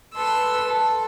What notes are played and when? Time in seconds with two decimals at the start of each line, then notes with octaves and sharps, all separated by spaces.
0.16 A4 B4 C6 E6
0.68 A4